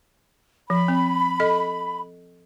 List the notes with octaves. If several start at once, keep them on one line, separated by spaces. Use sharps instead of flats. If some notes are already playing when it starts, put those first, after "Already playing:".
F3 B5
C4
A4 D#5